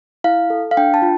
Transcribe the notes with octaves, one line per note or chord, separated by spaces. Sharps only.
E4 F5
A4
F5
D4 G5
A5
F4